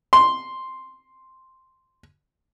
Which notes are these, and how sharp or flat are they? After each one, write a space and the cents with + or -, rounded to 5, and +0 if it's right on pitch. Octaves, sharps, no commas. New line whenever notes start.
C6 +0